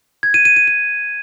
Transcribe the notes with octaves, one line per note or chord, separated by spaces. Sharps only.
G#6
D#7
D#7
D#7
D#7